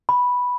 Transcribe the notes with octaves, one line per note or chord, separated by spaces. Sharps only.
B5